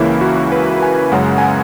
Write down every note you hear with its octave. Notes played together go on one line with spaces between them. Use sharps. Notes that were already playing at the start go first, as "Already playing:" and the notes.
Already playing: C#2 C#3 E3 A#3 C#4 E4
F#4
B4
G#5
F#2 C#3 G#3 F#5
G#5
F#5